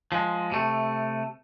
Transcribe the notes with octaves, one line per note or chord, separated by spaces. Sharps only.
F3 G#3
C3 A3